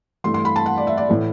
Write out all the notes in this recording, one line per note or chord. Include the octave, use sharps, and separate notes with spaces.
G2 E3 A3 C6
C6
B5
A5
F#5
D5
E5
D5
A2 E3 A3